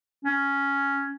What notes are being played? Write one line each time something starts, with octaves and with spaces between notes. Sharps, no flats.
C#4